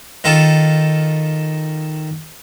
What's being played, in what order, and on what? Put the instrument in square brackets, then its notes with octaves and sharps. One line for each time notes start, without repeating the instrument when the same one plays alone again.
[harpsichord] D#3 F4 A4